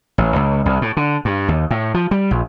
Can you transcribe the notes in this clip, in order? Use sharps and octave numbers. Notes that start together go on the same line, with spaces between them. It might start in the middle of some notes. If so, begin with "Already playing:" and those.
A1
C#2
C2
A2
D3
G2
D#2
A2
F3
G3
A#1